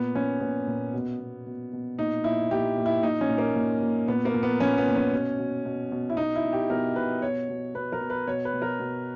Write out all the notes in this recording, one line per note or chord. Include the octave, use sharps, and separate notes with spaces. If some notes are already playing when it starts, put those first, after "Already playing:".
Already playing: A#2 B3
A#2 C#4
A#2 B3
A#2
B2
B2
B2
B2
A#2 D#4
A#2 E4
A#2 G4
A#2
E4
A#2 D#4
C#4
A#2
A#3
A#2
A#2
A#2 B3
A#3
A#2
B3
A#2 C#4
B3
A#2
C#4
B2
B2
B2
B2
E4
B2 D#4
E4
B2
G4
B2 A#4
B2 B4
B2 C#5
B2
B2 B4
A#4
B2
B4
B2 C#5
B4
B2
A#4
B2